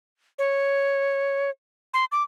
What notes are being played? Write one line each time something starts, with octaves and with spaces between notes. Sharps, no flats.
C#5
C6
D6